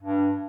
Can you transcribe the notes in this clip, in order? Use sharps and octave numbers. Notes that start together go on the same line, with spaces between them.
G2